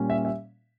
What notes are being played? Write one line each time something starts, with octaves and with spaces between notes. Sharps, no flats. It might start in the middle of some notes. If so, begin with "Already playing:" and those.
Already playing: A#2 G3 C#4
E5
E5